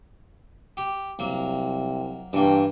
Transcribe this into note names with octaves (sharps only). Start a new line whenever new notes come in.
G4
C2 F#3 A#3
G2 E3 A#3 G5